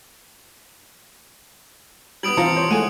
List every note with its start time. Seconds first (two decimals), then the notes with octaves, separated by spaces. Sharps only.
2.23 G3 B3 D#6 D7 F#7
2.37 E3 C4 F4 A5 A#5 C#7
2.56 C5 C#5
2.71 G#3 A3 F#5 G#5 D#7